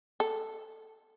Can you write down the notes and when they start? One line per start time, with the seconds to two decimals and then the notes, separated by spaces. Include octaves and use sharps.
0.20 A4